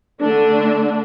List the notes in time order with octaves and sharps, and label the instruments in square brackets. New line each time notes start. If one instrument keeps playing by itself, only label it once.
[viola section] D3 A3 D4